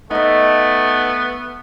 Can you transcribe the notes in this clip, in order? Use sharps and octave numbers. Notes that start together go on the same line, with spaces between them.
A3 B3 D#4 D#5